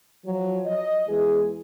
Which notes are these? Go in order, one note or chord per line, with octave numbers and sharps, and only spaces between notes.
F3 F#3
D#5
E2 E3 G#3 G#4